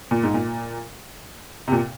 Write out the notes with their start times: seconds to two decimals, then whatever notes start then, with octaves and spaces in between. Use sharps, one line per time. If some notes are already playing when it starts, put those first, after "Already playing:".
0.11 A#2
0.23 G#2
0.34 A#2
1.68 C3
1.72 A#2